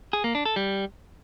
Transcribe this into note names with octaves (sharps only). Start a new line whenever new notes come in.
G#4
A#3
D4
A4
G3